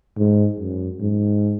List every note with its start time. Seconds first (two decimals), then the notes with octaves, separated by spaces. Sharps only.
0.18 G#2
0.60 F#2
1.01 G#2